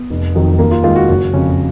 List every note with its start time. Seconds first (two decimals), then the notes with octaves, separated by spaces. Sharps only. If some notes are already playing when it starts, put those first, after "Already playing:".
Already playing: B3
0.10 F1
0.35 F2 D#3 F#3
0.59 D#2 A#3
0.71 F4
0.83 D#3 G#3 F4
0.96 F#4
1.09 F#1 F#4
1.34 F2 C#3 F#3 C#4